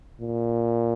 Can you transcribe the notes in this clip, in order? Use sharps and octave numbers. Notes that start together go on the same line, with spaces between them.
A#2